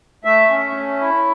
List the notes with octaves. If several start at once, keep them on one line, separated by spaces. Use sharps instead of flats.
A3 E5
C#4
A3
E4